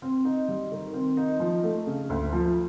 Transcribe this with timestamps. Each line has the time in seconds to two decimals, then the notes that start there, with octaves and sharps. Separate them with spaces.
0.02 C4
0.25 D#4
0.48 G3
0.72 D#3
0.94 C4
1.17 D#4
1.40 F3
1.63 A3
1.87 C#3
2.10 D2
2.33 F3